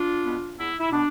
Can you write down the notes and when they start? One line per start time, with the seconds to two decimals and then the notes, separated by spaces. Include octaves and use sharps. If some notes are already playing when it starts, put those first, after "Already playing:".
Already playing: D4 F4
0.24 B2 B3
0.57 E2 E4
0.80 E4
0.91 B2 B3 D4